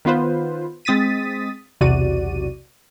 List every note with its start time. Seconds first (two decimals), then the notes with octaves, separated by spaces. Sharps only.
0.05 D#3 B3 F4 B4 C5
0.85 G#3 C4 D#6 A6 B6 D#7
1.81 B1 E2 C3 F#4 D5 D#7